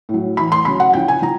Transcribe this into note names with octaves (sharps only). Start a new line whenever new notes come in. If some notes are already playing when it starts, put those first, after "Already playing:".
A2
F#3
A2 E3 B5
C6
C#3 F#3 B5
F#5
C#3 F3 G5
G#5
F3 A#5